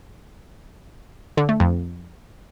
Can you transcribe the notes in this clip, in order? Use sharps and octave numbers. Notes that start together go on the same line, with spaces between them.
D3
A3
F2